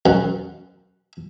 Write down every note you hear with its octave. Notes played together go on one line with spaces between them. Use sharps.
F#2